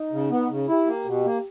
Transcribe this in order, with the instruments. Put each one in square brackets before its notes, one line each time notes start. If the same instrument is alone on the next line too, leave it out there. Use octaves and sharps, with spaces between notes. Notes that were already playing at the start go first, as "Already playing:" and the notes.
Already playing: [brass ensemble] D#4
[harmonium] C#3
B3
C#3
[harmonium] E4 [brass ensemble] G4
[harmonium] A#3
B2
A#3